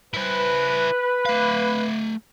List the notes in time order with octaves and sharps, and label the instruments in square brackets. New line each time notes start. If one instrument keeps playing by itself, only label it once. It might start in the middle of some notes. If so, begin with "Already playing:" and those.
[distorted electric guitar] E4 C5 [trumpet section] B4
[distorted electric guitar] A3 F5